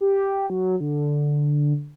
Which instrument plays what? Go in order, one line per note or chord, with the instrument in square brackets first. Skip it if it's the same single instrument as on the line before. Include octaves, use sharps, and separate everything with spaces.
[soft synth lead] G4
F#3
D3